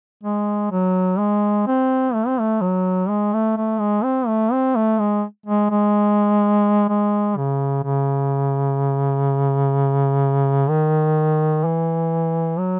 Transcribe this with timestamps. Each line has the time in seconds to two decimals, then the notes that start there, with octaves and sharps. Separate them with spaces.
0.24 G#3
0.71 F#3
1.18 G#3
1.67 C4
2.14 A3
2.27 C4
2.40 A3
2.61 F#3
3.09 G#3
3.33 A3
3.57 A3
3.80 G#3
4.04 C4
4.27 A3
4.52 C4
4.76 A3
4.99 G#3
5.46 G#3
5.70 G#3
6.89 G#3
7.37 C#3
7.84 C#3
10.69 D#3
11.64 E3
12.59 F#3